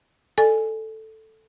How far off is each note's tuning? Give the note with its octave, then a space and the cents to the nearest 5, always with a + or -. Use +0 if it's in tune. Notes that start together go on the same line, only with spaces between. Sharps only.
A4 +0 D5 +40 G#5 +0